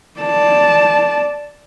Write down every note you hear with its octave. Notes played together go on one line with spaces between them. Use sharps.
D5 A5